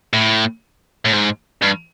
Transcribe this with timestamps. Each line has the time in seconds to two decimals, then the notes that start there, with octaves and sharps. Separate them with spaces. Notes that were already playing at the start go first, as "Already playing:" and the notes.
0.13 A2
1.05 A2
1.13 G#2
1.62 G2